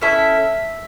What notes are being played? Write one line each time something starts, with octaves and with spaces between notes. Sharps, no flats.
C#4 E4 A4 E5